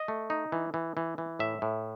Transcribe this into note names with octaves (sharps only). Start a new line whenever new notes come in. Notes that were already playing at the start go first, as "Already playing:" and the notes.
Already playing: D#5
A3
D#4
E3
E3
E3
E3
A2 E5
A2